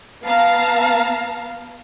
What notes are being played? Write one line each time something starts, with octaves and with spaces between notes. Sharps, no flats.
B3 F5 A5 A#5